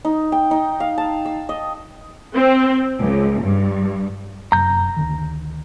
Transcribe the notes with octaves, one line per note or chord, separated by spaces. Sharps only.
D#4
G5
D#4
F5
A5
E6
D#5
C4
C#2
G2
F1 F#2 C3 A#5 G6
D2 D3 D#3